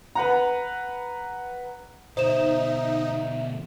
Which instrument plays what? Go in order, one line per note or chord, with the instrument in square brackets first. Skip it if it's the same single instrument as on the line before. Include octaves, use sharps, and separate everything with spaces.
[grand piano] B4 F#5 A#5
[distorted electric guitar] B2 D3 [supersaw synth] D#4 [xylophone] C5 E7 [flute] E5